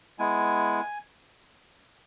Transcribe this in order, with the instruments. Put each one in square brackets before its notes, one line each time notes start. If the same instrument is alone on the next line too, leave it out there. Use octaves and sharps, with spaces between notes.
[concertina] G#3 B3 E4 G#5